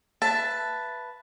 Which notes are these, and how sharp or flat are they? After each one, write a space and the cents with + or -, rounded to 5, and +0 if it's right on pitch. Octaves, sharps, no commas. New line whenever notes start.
B4 +0 E5 +25 A5 +0